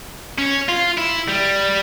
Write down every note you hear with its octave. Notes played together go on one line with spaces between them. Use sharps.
C#4
F4
E4
G3